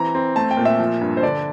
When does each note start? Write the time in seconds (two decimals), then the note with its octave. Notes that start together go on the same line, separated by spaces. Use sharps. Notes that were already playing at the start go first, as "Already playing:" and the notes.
Already playing: E3 C4 A#5
0.15 C4
0.36 A3 A5
0.51 G5
0.57 A#2
0.65 E5
0.79 F3
1.01 G2
1.17 C5
1.23 D3 D5